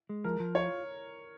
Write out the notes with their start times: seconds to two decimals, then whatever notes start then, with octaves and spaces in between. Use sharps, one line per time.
0.09 G#3
0.24 F3 A#4
0.40 F3
0.55 F4 C#5